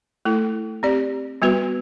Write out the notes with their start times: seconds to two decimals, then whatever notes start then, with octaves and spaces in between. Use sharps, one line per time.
0.25 A3 E4 A4
0.83 C4 G4 D5
1.42 G3 B3 F#4 B4